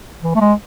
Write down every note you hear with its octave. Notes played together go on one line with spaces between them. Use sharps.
E3
A3
G#3